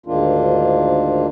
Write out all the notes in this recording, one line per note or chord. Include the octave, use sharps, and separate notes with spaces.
D2 G#2 D#3 A#3 D4 F4